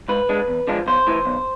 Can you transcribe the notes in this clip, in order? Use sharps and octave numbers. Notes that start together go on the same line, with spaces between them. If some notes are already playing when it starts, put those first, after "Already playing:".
G#2 B4
G#3 D4
E2
D3 F3 G#3 D4
B1 C5
A2 E3
B1